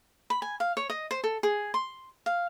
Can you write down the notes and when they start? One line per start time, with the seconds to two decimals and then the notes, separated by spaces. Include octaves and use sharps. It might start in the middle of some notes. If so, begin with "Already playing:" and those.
0.30 B5
0.42 G#5
0.60 F5
0.77 C#5
0.90 D#5
1.11 C5
1.24 A4
1.43 G#4
1.74 C6
2.26 F5